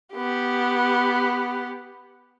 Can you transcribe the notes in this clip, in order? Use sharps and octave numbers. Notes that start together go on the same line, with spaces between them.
B3 G4